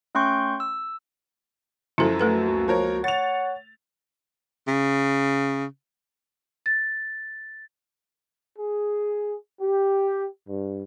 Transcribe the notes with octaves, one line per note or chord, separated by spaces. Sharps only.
A3 C#4 G5 C6 C#6 G6
E6
F#2 F3 F#3 E4 A4
A3 A4 B4
C#2 A#3 F#4
F3 A#4 C#5
C#5 F#5 A6 F7
C#3
A6
G#4
G4
G2